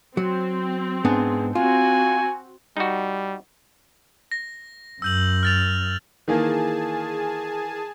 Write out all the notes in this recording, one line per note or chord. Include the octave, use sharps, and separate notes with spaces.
F#3 C4
G#2 B3 D4 G#4
C4 F4 F#4 G#5
G3 D#4 F#4
A#6
F#2 E6 G6 F#7
F6 A6 F7
D#3 E3 A#3 G#4 G#5 A5